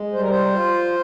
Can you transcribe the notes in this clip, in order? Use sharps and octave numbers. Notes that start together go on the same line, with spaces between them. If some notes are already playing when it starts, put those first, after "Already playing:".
Already playing: G#3
G3 C5
A#4
C5
F4